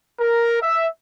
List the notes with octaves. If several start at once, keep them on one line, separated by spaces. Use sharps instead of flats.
A#4
E5